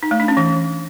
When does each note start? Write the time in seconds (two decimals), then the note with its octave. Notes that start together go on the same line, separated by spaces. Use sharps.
0.03 D#4
0.11 A3
0.20 D4
0.28 C#4
0.37 E3